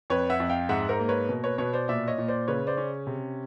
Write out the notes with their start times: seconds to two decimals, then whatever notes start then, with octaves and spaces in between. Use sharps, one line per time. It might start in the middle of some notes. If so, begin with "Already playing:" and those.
0.10 F2 B4 C#5
0.30 E5 F#5
0.40 F2
0.49 F5 G5
0.69 G#2 E5 F#5
0.89 A#4 C5
1.00 A#3
1.09 B4 C#5
1.29 B2
1.44 B4 C#5
1.58 B2 B4 C#5
1.73 C5 D5
1.88 A#2 D5 E5
2.08 C#5 D#5
2.18 A#2
2.28 C5 D5
2.48 C#3 B4 C#5
2.67 C5 D5
2.77 C#4
3.07 C3